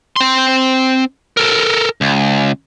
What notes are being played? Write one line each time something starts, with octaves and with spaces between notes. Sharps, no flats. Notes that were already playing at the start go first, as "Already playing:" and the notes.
C4 C6
A4 A#4
C#2